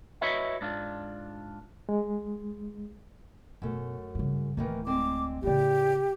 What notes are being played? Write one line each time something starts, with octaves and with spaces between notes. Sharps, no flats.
E4 F#4 B4 C#5 D#5 E5
G#2 D4 F4
G#3
F#2 B2 A3
G2 C#3
D1 D#3 E3 A3 A#3
D3 G#3 C4 D6
A2 C#3 B3 G4 D5